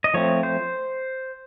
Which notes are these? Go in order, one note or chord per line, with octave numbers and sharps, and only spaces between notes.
D#5
F3 A3 C4 C#5
C5